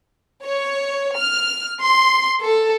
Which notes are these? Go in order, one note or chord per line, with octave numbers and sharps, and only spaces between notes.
C#5
F6
C6
A4